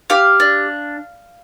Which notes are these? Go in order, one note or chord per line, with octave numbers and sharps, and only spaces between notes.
G4 F5
D4